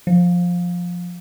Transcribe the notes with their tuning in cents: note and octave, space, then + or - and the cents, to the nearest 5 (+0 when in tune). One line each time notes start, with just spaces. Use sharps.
F3 +15